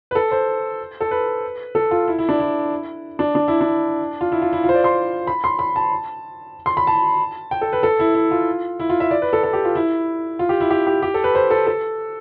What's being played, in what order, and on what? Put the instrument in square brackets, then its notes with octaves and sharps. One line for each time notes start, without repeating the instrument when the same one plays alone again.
[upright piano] B4
A4
C5
A4
B4
A4
F4
E4
E4
D4
E4
D4
D4
E4
D4
F4
E4
F4
E4
F4
C5
D5
C6
B5
C6
B5
A5
C6
B5
A5
G5
A4
B4
A4
E4
E4
F4
E4
F4
E5
D5
B4
A4
A4
G4
F4
E4
F4
G4
E4
G4
G4
G4
A4
B4
C5
A4
A4